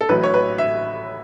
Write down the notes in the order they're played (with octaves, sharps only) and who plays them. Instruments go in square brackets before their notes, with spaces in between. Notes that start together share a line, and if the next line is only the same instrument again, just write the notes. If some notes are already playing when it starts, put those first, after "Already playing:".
[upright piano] A4
A1 A2 F#3 B4
C#5
B4
E5